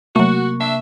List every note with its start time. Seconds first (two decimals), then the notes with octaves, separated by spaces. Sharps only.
0.16 C3 F#3 A3 A#3 F#4 C#6
0.61 D4 E5